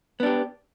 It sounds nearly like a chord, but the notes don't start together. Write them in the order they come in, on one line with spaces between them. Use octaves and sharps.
B3 D4 G4